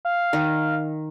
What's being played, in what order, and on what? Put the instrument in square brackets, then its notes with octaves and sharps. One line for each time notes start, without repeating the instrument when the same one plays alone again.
[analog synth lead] F5
[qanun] D#3